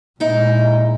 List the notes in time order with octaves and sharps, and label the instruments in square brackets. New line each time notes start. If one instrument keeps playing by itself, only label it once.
[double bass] A#2 G#3 [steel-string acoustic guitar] D#4 E4